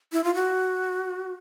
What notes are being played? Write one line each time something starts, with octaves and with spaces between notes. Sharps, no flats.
E4
F4
F#4